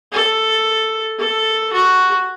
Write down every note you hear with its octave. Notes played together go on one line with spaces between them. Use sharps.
A4
A4
F#4